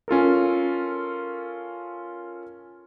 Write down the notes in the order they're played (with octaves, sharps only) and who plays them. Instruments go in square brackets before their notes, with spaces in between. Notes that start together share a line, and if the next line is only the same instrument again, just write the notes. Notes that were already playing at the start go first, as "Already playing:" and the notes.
[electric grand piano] C#4 F4 A4 A#4